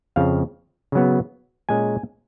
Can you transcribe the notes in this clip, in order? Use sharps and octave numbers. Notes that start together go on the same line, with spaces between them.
F2 C#3 F3 F5
C#3 F#3 B3
A#2 G#3 C#4 G#5